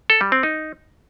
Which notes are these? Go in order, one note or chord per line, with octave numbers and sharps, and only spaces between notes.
A4
G3
C4
D#4